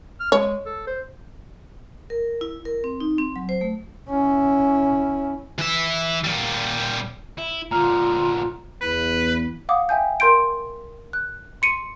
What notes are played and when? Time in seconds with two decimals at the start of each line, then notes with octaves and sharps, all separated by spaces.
0.20 F6
0.32 G#3 C#5
0.66 A4
0.87 C5
2.10 A#4
2.41 E4
2.65 A#4
2.84 C4
3.00 D#4
3.18 C4
3.36 F#3
3.49 C5
3.61 A3
4.09 C#4 E4
5.58 E3 E5
6.24 A#2 G3
7.38 E4
7.71 A#2 D3 F4 A#5 F6
8.81 E2 B4
9.69 F5 F#5 D6 D#6
9.89 E5 G5 G#5 G6
10.20 A#4 C6 G6 D7
11.13 F#6
11.62 C6 C#7 D#7